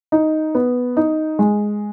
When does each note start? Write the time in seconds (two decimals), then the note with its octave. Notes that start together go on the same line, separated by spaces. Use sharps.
0.12 D#4
0.55 B3
0.97 D#4
1.39 G#3